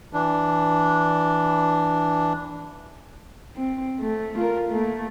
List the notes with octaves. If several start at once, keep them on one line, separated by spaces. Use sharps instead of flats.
E3 D4
C4
A3
F4 A#4
A3 A#3